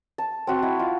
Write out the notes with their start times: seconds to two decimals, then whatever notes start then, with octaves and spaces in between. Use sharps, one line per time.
0.18 A5
0.47 C4 F#4
0.63 E4
0.79 F4